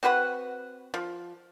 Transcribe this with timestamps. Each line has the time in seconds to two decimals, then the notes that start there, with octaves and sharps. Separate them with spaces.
0.03 C4 F#4 B4 F#5
0.94 F3